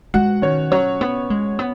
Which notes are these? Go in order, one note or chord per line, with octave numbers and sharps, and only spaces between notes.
G#3 F#4 F#5
D#3 C#4 C#5
F#3 C#4 C#5
B3
G#3
B3